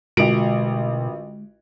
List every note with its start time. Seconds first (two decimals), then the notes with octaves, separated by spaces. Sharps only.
0.17 A1 B2 D3 G#3 F4 F#4 A#4 D7